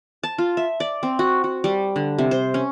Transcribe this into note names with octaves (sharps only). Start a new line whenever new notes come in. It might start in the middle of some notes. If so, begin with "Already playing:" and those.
A5
F4
E5
D5
C4
F#4
F#4
G3
D3
C3
C5
C#4